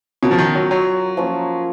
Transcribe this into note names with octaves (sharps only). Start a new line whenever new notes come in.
B2 C#4 F4 A#4
F3
D#3
F#3
F#3
F3 A#3 C#4